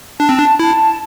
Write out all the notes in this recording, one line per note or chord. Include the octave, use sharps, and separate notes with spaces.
D4 A5
C4
D4
E4 A5